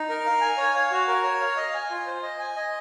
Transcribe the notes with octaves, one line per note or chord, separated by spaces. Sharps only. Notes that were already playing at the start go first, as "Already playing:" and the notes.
Already playing: D#4
A#4
F5
G#5
C#5
F5
F#4
A#4
C#5
F5
D#5
G#5
F4
C5
D#5
G#5
D#5